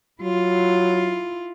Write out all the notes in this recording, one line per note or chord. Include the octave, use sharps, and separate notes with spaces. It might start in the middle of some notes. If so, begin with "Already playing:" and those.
F#3 E4 F4